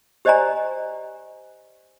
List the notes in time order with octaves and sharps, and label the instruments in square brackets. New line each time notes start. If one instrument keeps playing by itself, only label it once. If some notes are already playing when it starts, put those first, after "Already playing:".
[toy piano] G4 C5 D5 D#5 G#5 A#5